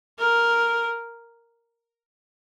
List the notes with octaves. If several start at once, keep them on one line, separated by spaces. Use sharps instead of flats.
A#4